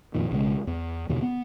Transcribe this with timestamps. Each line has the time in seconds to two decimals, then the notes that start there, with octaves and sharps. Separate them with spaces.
0.15 F2 A#2 D#3
0.31 B1 C#3 G#3
0.67 E2
1.09 D#2 B2 D3
1.22 B3